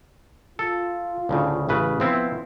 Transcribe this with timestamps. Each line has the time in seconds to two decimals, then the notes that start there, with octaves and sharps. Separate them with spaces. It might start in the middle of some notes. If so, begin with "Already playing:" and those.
0.59 F4 A4
1.29 D2 A2 C#3
1.69 A1 C#3 B4
2.00 F3 B3 C4 E4